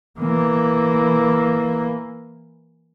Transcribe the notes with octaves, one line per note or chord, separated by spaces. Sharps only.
E3 A#3